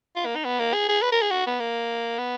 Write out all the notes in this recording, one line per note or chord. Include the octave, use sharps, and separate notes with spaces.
F4
A#3
D#4
B3
A#3
G#4
G#4
B4
A#4
G#4
F#4
B3
A#3
B3